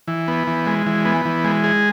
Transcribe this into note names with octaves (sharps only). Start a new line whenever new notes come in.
E3
B3
E3
G#3
E3
B3
E3
G#3
G#4